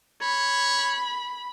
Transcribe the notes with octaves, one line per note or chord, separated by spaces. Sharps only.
C#5 B5